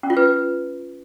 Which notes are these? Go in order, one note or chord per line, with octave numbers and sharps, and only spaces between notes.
C#4
F4
B4